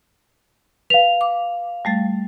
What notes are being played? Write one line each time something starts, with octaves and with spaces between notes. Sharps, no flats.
B4 F5 F7
D6
G3 A3 A6